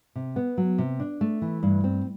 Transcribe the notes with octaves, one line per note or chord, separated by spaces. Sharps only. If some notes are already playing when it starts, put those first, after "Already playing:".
C3
B3
F#3
C3
D4
A3
E3
G2
C4